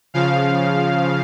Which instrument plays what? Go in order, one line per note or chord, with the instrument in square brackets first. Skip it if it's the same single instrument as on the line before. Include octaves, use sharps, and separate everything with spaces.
[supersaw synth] C#3 F3 F5